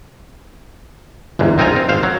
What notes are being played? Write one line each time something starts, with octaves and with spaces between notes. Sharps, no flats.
G1 E2 G#2
A#1 C4 D#4 F4 G#5 A#5
C4
G#1 C5 F5
F#3